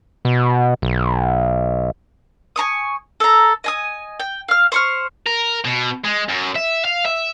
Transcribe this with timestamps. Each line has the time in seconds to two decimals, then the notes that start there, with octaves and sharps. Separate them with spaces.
0.25 B2
0.82 B1
2.56 G#5 A#5 C#6 D#6
3.20 A4 A#5
3.64 D#5 G#5 D#6
4.20 G5
4.48 F5 F6
4.72 C5 C#6 F6
5.27 A#4
5.65 B2
6.04 G#3
6.29 F#2
6.56 E5
6.84 F5
7.05 E5